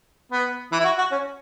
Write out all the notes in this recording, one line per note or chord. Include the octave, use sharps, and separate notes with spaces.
B3
E3
E4
F#4
F#4
C#4